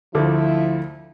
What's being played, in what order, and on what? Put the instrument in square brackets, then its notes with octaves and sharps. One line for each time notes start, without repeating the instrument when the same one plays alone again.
[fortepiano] D2 A3 D6 [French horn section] F3 E4